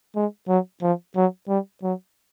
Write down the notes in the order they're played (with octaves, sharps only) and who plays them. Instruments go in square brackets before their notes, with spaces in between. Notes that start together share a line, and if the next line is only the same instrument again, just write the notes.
[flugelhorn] G#3
F#3
F3
F#3
G3
F#3